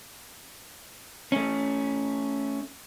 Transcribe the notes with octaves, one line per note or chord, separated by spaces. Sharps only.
A3 C#4